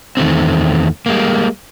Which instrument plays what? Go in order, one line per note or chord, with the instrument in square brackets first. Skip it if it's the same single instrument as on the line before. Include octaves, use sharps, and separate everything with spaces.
[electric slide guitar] E2 D#3 A3 C4
G3 G#3 A#3